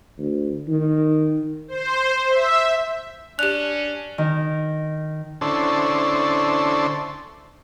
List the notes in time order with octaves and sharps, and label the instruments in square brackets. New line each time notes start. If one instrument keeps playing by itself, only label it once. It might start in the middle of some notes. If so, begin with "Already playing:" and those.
[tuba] D2
D#3
[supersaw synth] C5
E5
[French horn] C#4 [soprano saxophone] D4 [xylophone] G4 F7 [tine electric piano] F#6
[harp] D#3
[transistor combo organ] D3 C#4 D4 E4 A4 C5